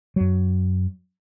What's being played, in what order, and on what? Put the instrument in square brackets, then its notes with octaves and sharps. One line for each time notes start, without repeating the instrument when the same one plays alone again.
[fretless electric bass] F#2 F#3